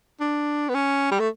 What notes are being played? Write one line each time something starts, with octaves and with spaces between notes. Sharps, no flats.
D4
B3
C#4
G3
A3